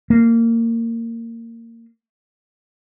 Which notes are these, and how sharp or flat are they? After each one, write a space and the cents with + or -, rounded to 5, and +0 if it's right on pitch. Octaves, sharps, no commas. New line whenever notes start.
A#3 -20